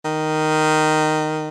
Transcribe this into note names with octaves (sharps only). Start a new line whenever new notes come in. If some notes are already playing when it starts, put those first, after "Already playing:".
D#3